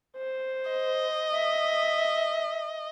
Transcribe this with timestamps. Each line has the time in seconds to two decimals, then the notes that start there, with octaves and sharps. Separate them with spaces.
0.17 C5
0.71 D#5
1.34 E5